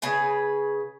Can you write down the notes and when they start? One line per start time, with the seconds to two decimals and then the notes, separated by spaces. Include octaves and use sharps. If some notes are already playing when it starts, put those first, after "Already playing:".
0.02 C#3 G#4 B4 G#5